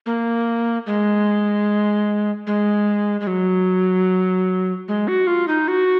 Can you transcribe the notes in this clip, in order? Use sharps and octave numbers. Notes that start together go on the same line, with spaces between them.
A#3
G#3
G#3
G#3
F#3
G#3
F#4
F4
D#4
F#4